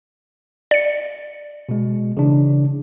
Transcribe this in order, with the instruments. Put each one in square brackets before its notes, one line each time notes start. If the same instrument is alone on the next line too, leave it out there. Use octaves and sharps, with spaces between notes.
[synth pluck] D5 C#7
[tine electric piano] B2 G#3
C#3 E3 D4